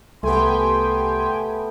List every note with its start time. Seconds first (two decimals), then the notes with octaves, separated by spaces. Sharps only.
0.23 C2 A3 B3 G4 G5 G#5 C6